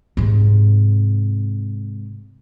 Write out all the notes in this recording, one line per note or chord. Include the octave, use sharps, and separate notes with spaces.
G#2 C3